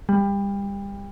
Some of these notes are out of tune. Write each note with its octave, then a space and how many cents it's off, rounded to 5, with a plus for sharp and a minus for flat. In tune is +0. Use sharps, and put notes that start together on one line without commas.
G3 +30